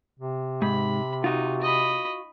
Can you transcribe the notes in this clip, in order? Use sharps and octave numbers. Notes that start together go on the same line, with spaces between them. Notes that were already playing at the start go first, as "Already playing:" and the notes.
C3
G#2 B5
D#4 F4 F#4
D#5 B5